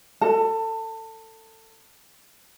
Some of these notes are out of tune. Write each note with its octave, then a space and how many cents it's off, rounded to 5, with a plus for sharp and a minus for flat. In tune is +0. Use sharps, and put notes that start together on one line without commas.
A4 +25